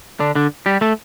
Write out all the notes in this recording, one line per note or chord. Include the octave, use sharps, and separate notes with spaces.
D3 D4
D3 D4
G3 G4
A3 A4